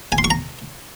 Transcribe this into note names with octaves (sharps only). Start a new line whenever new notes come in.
G#5
C6
C#6
A#5